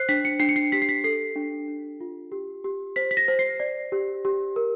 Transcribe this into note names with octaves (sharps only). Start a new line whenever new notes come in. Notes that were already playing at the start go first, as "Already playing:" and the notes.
Already playing: C5 F#6 C7
D4 B6
C#7
D4 C7
C#7
C7
G4 B6
C7
B6
A4 C7
D4
D4
F4
G4
G4
C5 B6
B6
A#6
C5
C7
D5
G4
G4
A#4